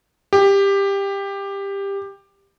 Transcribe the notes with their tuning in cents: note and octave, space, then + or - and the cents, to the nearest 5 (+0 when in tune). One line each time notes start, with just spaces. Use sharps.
G4 +15